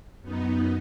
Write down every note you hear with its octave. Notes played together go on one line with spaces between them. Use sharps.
F#2 B3 D#4